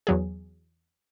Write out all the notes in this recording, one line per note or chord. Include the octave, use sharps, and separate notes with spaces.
E2 F#3 G#4